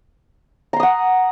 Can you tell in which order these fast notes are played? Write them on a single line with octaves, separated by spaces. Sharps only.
A#5 C6 D#6 F#5